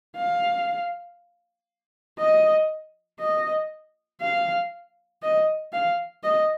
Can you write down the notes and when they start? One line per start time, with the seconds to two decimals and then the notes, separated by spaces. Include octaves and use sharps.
0.16 F5
2.19 D#5
3.20 D#5
4.22 F5
5.23 D#5
5.73 F5
6.24 D#5